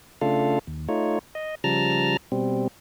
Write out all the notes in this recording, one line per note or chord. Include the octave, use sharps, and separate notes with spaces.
C#3 A3 D4 F4 A4 F5
D#2
A3 D#4 F4 C#5
D#5
C#3 F3 G3 A5 A#5 F6
B2 G3 C4